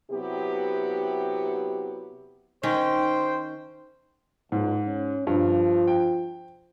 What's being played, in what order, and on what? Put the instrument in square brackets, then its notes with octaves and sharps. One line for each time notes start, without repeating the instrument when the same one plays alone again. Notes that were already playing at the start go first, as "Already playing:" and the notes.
[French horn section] C3 F#3 B3 E4 G4
[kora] D#3 C#4 [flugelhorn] C5 [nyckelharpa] G5
[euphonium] C#2 [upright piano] G#2
[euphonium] C#4
[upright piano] G2 [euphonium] F3
[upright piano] G5